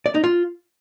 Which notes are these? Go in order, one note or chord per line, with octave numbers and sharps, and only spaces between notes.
D5
D#4
F4